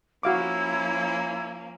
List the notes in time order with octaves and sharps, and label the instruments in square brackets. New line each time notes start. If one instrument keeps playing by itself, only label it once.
[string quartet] F3 A#3 C#4 [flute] E4 [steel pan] F#4 F5 D6